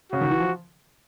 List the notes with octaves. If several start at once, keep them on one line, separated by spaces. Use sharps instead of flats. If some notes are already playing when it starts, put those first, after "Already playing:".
C#3 F#4
D#3
E3
F3